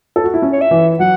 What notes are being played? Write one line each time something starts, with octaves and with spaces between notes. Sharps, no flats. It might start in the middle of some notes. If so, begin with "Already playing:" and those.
A4
F#4
E4
C#4
C#5
E5
E3
F#3 F#5